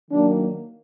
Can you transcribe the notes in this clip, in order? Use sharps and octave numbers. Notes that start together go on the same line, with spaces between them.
D#3 F#3 A#3 D4